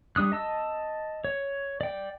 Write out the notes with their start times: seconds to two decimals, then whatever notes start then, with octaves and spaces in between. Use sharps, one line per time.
0.16 G3 D4 D#6 F#6
0.32 D#5 A5 E6
1.24 C#5
1.81 D5 G5